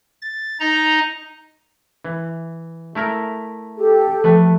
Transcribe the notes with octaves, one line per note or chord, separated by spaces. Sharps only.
A6
D#4 D#5 A#5
E3
A3 E4 A#4
G4 A4
F3 A3 B4